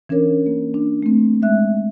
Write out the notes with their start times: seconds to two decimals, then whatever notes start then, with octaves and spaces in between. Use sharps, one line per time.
0.09 E3 C#4 D4 A#4 C#5
0.46 A#3
0.74 D4
1.03 A3 C4
1.42 G#3 E5 F#6